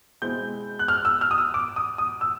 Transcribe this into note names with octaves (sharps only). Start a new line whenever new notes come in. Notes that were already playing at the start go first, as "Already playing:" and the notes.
B2 G#3 C4 E4 G6
F#6
F6
E6
F6
D#6
E6
D6
D#6
D#6
E6